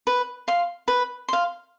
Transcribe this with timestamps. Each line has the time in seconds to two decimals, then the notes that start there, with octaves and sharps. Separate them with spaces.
0.07 B4
0.48 F5 C6
0.88 B4
1.29 F5 C6